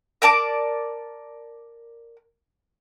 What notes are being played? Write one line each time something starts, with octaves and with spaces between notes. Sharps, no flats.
A#4 D5 A5 D6